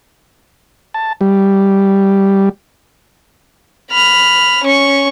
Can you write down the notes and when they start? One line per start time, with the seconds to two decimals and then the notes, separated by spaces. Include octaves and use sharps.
0.94 A5
1.21 G3
3.91 B5 F6
4.63 C#4 C#6